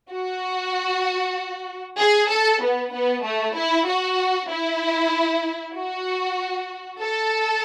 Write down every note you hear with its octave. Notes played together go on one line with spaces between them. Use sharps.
F#4
G#4
A4
B3
B3
A3
E4
F#4
E4
F#4
A4